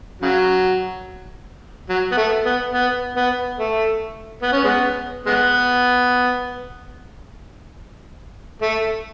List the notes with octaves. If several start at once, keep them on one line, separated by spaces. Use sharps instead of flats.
C#3 F#3
F#3
B3
A3
B3
B3
B3
A3
B3
C#4
G#3 B3
G#3 B3
A3